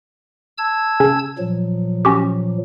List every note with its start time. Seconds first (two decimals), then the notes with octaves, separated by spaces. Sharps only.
0.58 A5 E6 G#6
1.00 C#3 C#4
1.38 A#2 F3 F#3
2.05 C#4 F#4 G4